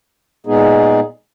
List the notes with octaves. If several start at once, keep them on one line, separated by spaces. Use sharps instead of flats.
A#2 G#3 B3 D#4 G#4